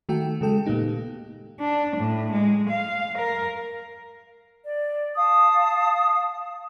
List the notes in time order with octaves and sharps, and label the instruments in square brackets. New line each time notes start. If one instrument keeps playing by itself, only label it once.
[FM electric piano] D#3 A3 F#4 A4 G5
C#3 G#3 A4 G5
A#2 A#3 B3 D#4 G4
[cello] D4
A2
G#3
F5
A#4
[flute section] D5
F5 A5 D#6